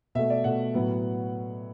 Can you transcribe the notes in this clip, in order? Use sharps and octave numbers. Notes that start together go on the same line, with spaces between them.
B2 A3 E5
D5
B2 A3 F#5
A2 F#3 B3